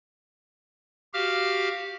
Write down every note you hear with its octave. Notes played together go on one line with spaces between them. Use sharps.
F#4 G4 F5 F6